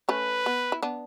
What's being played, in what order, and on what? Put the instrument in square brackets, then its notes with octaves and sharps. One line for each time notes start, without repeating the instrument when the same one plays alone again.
[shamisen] A3 C#4 [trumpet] B4
[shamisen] B3
E4
B3 D4